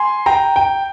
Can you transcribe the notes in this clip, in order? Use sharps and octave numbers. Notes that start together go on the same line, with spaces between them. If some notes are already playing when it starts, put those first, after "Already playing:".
Already playing: G#5 C6
G5 A#5
G5